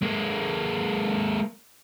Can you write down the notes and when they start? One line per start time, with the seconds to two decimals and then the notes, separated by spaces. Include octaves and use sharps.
0.02 G#3 A#3